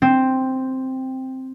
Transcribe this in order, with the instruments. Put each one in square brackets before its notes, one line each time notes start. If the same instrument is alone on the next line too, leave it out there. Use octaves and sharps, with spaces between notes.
[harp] C4